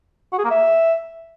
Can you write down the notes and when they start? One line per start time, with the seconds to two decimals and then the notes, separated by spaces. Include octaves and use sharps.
0.33 F#4
0.39 G#4
0.45 A#3
0.51 E5